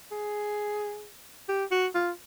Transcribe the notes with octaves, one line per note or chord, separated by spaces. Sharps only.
G#4
G4
F#4
F4